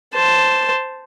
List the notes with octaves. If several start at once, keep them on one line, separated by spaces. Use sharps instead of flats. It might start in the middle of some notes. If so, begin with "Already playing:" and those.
C5 A5